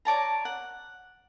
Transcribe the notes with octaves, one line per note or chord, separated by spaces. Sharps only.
C#5 D5 A5 A#5
F#5